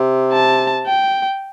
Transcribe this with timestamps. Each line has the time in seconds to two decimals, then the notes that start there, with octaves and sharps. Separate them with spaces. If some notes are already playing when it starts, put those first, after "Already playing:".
Already playing: C3
0.33 A5
0.87 G5